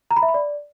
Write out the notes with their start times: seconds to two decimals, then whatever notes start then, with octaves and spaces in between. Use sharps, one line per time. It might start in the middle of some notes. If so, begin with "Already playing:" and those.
0.11 A#5
0.17 B5
0.22 E5
0.28 B5
0.34 D5